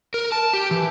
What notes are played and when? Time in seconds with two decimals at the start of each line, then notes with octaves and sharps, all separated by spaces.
0.14 A#4
0.32 A5
0.54 G4
0.71 E3